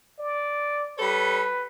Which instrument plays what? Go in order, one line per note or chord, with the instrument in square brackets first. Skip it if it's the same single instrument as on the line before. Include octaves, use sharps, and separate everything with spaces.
[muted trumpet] D5
[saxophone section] G3 A4 C#5 [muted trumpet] B4